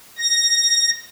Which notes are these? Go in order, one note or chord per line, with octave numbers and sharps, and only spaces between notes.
A#6